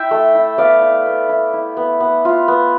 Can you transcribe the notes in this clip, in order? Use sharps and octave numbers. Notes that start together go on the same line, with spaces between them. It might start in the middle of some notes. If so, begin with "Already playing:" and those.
Already playing: E4 E5 G5
A3
E4
B3 D5 F5
E4
B3
E4
E4
B3
B3
F4
B3